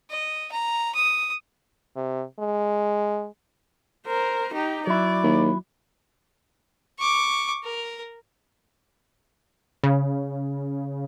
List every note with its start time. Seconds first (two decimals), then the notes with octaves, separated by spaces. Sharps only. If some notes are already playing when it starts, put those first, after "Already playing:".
0.10 D#5
0.52 A#5
0.95 D#6
1.96 C3
2.39 G#3
4.06 A#4 C5
4.55 D#4 G4
4.87 F#3 E4 D5
5.23 D#2
6.99 C#6 D6
7.64 A#4
9.84 C#3